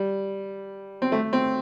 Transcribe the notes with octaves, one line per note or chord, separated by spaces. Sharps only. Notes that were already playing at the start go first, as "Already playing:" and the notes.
Already playing: G3
C4
A3
C4